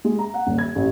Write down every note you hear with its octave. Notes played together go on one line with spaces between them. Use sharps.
G#3
A#5
F#5
D#1
G#6
A1